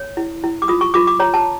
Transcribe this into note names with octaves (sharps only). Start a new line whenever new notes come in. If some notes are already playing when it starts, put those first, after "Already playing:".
Already playing: C#5
E4
E4
D6
F4 D#6
C#6
F4 D6
D6
C#5 A#5
A5